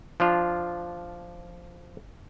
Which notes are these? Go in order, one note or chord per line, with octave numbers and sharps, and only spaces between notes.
F3 D4 F4